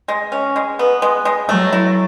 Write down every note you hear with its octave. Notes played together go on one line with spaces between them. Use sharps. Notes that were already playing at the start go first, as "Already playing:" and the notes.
G#3
C#4
G#3
B3
G#3
G#3
F#3 A3
E4